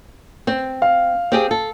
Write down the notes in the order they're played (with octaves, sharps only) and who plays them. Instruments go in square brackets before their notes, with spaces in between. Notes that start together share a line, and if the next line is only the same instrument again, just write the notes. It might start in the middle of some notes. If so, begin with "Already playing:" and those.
[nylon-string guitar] C4
[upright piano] F5
[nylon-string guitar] C4 G4 G#4
A4